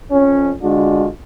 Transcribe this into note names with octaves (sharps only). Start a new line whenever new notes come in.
F2 C#4
D3 G#3 D4 F4 F#4